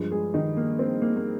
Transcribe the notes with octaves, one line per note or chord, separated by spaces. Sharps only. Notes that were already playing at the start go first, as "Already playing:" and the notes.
Already playing: G2 F3 G#3
G#3 G#4
D#3 D#4
A#3
C4
A#3
A#3